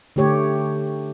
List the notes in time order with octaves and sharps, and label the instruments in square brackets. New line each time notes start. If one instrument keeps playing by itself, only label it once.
[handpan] D3 A3 G4 C#5